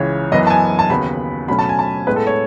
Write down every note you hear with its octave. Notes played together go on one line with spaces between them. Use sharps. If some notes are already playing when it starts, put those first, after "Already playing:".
Already playing: C#2 C#3 E3 C#5
F#2 E3 B3 D#5
A5
G#5
A5
D#2 C#3 F#3 B3 B5
B2 F#3 A3 C#4 B5
A5
G#5
A5
A2 G#3 B3 B4
A4
C#5